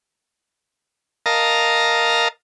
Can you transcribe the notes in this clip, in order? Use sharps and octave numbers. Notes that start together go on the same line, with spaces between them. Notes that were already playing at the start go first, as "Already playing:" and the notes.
A#4 D#5 F5 A5 A#5